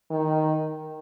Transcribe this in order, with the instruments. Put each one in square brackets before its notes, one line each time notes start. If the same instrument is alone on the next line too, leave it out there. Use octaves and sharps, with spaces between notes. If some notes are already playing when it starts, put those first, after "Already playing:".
[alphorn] D#3